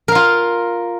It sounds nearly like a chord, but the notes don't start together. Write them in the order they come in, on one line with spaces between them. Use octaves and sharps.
A#4 F5 F4